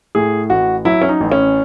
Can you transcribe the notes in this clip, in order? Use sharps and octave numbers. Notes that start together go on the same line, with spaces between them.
A2 G#4
A1 F#4
F#3 E4
C#4
D#4
A1
C#4